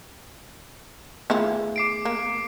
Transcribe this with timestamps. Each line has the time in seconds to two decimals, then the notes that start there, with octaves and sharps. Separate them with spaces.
1.30 D#3 A3 B3 E4 F4 G#4
1.76 D6 C7 D7
2.05 A#3